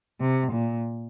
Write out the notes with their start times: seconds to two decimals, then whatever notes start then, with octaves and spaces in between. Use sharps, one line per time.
0.21 C3
0.53 A#2